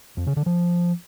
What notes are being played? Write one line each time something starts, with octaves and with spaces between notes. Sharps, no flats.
F2
C#3
D3
F3